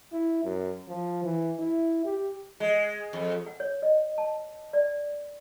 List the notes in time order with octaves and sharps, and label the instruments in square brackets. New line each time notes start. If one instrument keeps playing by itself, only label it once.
[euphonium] E4
F#2
F3
E3
E4
G4
[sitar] G#3
F2
[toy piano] F#5
C#5
D#5
A5
D5